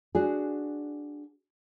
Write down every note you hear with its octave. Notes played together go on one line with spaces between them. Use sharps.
D4 F#4 G#4